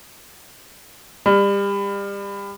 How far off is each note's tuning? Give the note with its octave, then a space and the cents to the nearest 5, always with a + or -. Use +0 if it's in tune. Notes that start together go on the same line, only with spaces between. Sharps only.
G3 +30